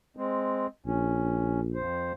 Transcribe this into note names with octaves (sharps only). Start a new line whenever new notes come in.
G#3 C4
A#1 C#4
F2 C5